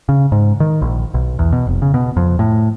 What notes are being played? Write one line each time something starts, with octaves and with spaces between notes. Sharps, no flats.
C#3
G#2
D#3
A#1
B1
E2
B2
F1
C#3
B2
F2
A2